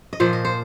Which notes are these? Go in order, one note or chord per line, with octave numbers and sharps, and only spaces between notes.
D#5
A#2 F3 C5
D#5
C5